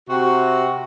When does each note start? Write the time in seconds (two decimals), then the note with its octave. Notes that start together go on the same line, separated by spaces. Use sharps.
0.10 C3 F#4